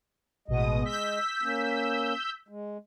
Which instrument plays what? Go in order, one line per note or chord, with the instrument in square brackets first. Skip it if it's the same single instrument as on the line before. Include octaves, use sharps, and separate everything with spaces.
[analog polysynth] A1 B2 D#6 [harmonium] G#3 D#5
[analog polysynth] E6 G6 B6
[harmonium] A#3 C#4
G#3